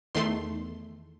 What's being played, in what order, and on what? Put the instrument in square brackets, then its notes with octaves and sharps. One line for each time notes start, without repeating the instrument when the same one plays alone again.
[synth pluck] E2 D#3 A3 C6